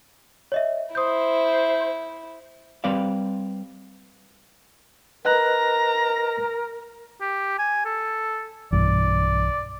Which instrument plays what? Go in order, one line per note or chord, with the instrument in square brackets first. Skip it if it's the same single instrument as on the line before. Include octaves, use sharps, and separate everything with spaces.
[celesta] C#5 D#5 E5
[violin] E4 [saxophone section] C5 [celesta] D#6 G6
[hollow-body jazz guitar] G3 C4 B4 D5 F5
[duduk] A#4 [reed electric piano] B4 D#5 F#6 [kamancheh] A#5
[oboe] G4
G#5
A4
[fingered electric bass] B1 G2 E3 [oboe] D5